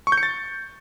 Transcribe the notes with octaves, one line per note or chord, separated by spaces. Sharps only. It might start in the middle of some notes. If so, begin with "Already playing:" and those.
C#6
G6
C#7
A6